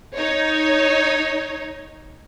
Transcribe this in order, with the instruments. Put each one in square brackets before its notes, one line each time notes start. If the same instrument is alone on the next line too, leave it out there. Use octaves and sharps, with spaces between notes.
[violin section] D#4 C#5